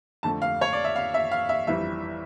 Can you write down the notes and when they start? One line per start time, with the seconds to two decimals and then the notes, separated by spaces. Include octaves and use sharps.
0.23 F2 D3 A3 A5
0.42 F5
0.61 C#5
0.73 D5
0.84 E5
0.96 F5
1.14 E5
1.31 F5
1.49 E5
1.67 G1 F2 E3 G3 E5